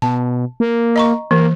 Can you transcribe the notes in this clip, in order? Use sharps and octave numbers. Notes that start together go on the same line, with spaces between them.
B2 A5
A#3
D#5 A#5 C#6
E3 A#3